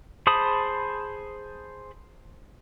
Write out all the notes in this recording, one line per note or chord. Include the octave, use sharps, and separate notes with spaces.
G#4 C5 A5 B5 D#6